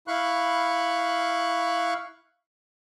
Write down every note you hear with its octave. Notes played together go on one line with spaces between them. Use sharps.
E4 F5 B5 C#6 F#6